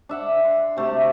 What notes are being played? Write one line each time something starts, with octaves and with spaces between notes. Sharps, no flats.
D4 E5 F#5
C6
C3 A3 F#4 G4